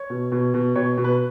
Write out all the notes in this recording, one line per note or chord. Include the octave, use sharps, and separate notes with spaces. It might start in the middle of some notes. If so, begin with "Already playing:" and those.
Already playing: C#5
B2
B2
B2
B2 C#5
B2
B4